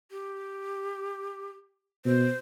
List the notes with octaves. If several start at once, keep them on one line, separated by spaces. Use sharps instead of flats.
G4
B2 C5